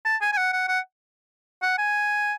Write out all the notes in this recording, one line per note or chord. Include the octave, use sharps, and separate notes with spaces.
A5
G#5
G#5
F#5
F#5
F#5
F#5
G#5